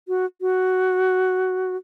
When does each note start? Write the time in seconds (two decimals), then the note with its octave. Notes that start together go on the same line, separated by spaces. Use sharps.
0.08 F#4
0.41 F#4